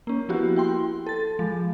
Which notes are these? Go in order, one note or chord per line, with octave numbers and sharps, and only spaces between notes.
A#3 C#4
F3 A#3 B3 E4 F#4 G4
E4 G5 C6
A4 A6
F3 G#3